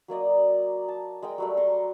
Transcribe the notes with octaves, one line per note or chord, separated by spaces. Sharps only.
F#3 A#3 D5 D#5
A5
G#3 A#4 D#5 G5
F#3 G3 A3
A#5 C6 C#6